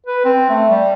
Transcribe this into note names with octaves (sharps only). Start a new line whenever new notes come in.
B4
C4
A3
G3